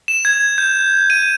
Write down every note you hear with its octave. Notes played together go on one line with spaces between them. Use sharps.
E7
G#6
G6
D#7